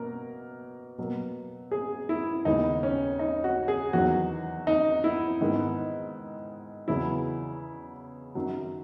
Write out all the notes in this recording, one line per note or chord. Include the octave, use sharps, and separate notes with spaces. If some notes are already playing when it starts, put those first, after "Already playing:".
Already playing: B2 A#3 A#4
B2 F#3 A#3
G#4
E4
D#2 C#3 G#3 B3 D#4
C#4
D#4
F#4
G#4
E2 D#3 F#3 F#4
D#4
E4
G#2 D#3 G#3 B3
E2 C#3 F#3 B3 E4
F#2 D#3 F#3